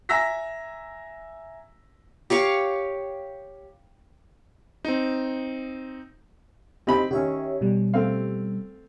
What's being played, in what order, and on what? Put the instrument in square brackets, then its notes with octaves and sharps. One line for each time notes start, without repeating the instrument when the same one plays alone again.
[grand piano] E5 G#5 A#5 E6 A#6 B6
[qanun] G4 C#5 F5 C#6
[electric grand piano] C4 D#4
[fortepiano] C4 D#4 B5 [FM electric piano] G4
[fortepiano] D#3 C#4 [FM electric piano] G4 C#5 E5
[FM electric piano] B2 G3
[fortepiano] A3 C4 F5